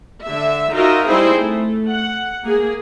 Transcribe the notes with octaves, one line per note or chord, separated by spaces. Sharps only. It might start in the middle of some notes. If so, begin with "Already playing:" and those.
D3 E5
D#4 F4 F#4 A#4 E5
G3 C4 D#4 E4 G#4 C5
A3
F#5
A#3 G#4